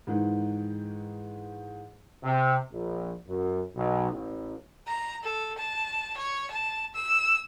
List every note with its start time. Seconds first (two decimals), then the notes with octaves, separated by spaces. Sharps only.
0.07 G#2 D#3 E3
2.23 C3
2.71 A#1
3.27 F#2
3.75 B1
4.10 A1
4.87 A#5
5.23 A4
5.58 A5
6.17 C#5
6.51 A5
6.94 E6